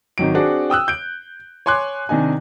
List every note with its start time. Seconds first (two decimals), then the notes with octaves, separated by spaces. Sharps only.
0.18 G#1 D#3 F#3 D7
0.35 C4 D4 F#4 G#4
0.70 G5 D#6 E6 F#6
0.88 G6 D7
1.66 C#5 G#5 C6 D6 F#6
2.09 C3 D#3 D4 D#4 G#5